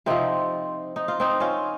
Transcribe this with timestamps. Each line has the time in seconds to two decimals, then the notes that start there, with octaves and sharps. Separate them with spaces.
0.06 C3 F3 C4 D#4
0.96 D#4
1.08 F4
1.20 C4 D#4
1.40 C#4 F4